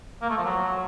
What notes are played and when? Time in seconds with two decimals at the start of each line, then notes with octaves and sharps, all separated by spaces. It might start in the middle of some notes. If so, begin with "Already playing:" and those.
0.22 A#3
0.30 A3
0.37 F3
0.45 F#3